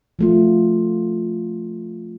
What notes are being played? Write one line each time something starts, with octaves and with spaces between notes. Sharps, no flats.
F3 A3 F4